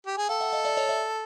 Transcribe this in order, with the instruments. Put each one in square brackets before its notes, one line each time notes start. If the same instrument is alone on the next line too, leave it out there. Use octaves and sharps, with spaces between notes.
[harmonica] G4
G#4
[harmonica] A4 [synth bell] F5 G5
[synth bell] E5 F#5
D#5 F5
D5 E5
C#5 D#5
D5 E5